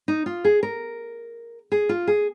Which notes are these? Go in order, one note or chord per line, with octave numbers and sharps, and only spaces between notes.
D#4
F4
G#4
A#4
G#4
F4
G#4